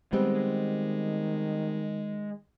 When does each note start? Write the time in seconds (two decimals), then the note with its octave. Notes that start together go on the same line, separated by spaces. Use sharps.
0.13 D#3 G3 G#3 B3 C4